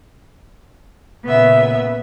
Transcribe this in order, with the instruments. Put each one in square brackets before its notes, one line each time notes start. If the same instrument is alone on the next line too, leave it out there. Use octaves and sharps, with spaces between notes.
[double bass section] A#2 C#3 [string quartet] B3 E5